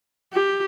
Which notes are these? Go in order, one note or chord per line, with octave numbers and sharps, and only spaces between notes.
G4